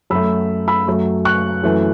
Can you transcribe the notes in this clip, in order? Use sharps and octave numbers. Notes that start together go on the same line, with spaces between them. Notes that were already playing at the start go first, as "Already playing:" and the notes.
F#2 F#3 A3 B5 E6
B5 E6
F#2 F#3 A3
C#6 F#6
F#2 E3 A3